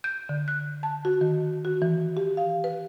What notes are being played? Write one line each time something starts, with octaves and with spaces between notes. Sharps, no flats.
G6
D3
F#6
A5
F#4
D#3
F#4
E3
G4
F5
B4